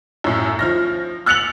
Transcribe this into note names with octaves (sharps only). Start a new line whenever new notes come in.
F#2 A2
F3 F6 A#6
E6 F#6 A6 C#7 F7 F#7